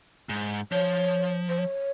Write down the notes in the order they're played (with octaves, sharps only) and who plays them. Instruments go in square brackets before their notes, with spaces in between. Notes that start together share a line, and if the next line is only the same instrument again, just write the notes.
[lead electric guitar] G#2
[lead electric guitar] F3 [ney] C#5
[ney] C5
C#5